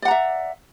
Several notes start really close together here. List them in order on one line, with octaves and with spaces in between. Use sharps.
D5 F#5 A#5 E5